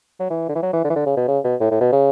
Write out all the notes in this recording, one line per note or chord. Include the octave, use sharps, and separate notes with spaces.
F#3
E3
D3
E3
F#3
E3
D3
E3
D3
C#3
B2
C#3
B2
A2
A2
B2
C#3